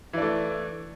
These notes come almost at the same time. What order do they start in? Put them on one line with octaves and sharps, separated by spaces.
E3 D4 A3